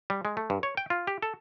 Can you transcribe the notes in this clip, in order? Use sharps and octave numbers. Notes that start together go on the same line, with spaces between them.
G3
G#3
A3
G2
C#5
G5
F4
G4
A4